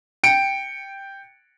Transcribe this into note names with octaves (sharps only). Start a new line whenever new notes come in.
G5 C#7 D7